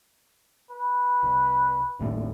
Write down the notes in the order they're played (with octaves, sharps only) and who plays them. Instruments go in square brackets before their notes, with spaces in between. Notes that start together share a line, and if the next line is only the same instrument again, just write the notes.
[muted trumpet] B4
[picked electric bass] C2
G#1 D#2 A2